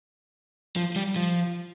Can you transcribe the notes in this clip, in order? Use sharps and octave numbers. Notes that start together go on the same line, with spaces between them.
F3
G3
F3